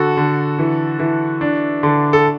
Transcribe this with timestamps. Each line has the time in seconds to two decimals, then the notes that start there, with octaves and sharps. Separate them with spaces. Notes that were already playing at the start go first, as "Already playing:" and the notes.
Already playing: D3 F#4 A4
0.17 D3
0.59 E3
0.99 E3
1.41 D4
1.83 D3
2.13 A4